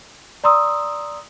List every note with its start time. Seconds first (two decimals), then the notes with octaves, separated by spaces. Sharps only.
0.44 D5 A#5 C6 D#6 E6